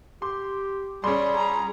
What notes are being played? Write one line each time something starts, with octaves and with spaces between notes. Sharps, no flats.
G4 C6
G3 C#4 G#4 D5 C6
G#4 A#5